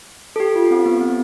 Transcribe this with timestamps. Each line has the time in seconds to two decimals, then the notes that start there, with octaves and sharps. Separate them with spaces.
0.36 A4
0.40 G4
0.56 F4
0.71 C4
0.86 B3
1.01 C4